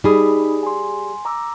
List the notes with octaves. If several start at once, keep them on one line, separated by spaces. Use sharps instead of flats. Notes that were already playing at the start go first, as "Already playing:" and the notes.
G3 D#4 G#4 B5 D#6
G#5 C6
A#5 D6 E6